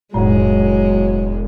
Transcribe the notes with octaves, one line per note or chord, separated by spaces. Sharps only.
E1 F2 A2 F#3 G#3